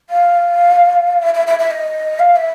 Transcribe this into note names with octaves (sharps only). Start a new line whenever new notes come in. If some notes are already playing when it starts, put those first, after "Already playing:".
F5
E5
E5
E5
E5
D#5
F5
E5